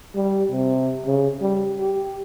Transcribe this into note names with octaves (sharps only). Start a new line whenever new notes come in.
G3
C3
C#3
G3
G4